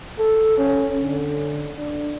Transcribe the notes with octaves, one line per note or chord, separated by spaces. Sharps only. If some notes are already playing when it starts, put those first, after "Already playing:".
A4
C#4
D3
D4